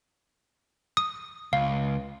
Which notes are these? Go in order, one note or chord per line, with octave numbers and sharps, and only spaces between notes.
D#6
C#2 F5